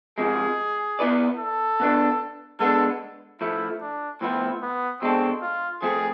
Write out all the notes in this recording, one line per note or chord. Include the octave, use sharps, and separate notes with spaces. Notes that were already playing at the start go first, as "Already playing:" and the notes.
C3 F3 G#3 C4 G#4
B3 E4 B4 D5
A4
B2 B3 D4
G#3 B3 D4 A4
A2 F3 A3 E4
D4
A2 F3 B3 C4 E4
B3
B2 G#3 C4 D4 A4
F4
F3 A3 C4 G#4